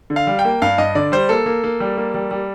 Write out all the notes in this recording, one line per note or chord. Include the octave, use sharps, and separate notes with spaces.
D3
F5
G3
G5
A#3
G2 F5
G2 D#5
D3 D5
G3 C5
A#3 A4
A#3
A#3
G3
A#3
G3
G3